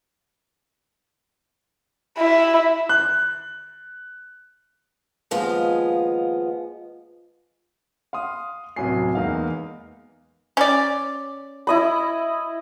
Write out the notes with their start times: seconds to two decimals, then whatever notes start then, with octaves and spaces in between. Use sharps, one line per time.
2.20 E4
2.89 F#6
5.31 D#2 F3 G#3 B3 F4
8.13 F5 C6 D#6
8.76 D1 C2 F#3 C#4 G#5 C7
9.15 E2 G#3 A#3 D#4 D#5 F5
10.57 C#4 D5
11.67 E4 D#5 B5